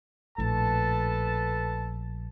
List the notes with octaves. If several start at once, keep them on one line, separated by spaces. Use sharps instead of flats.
A#1 A2 A4 B4 A5